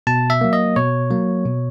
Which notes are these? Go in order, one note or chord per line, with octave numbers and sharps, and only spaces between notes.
B2 A5
E5
F#3 A#3
D#5
B2 C#5
F#3 A#3
B2